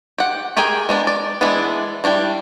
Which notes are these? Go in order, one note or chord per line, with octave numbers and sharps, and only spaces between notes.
G4 F#5
G4 G#4 A#4 G5 G#5
G#3 B3 D4
D5
E3 G#3 B3 D4 E4
G3 D4 E4 G5